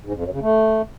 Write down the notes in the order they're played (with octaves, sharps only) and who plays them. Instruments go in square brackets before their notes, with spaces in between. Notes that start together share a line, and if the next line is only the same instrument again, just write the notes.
[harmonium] G#2
F2
F#2
C#3
A3